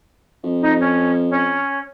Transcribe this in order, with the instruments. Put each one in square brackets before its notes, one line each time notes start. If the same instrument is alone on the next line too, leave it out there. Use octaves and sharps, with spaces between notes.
[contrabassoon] F2
[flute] D#4
C#4
C#4